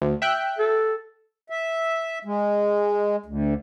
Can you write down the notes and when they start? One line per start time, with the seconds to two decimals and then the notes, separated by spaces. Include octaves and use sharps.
0.02 D2
0.22 E5 G5 F#6
0.58 A4
1.50 E5
2.25 G#3
3.26 D2